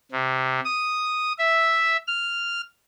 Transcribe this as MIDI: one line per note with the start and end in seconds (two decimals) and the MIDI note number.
0.12 0.60 48
0.64 1.32 87
1.38 1.97 76
2.07 2.61 89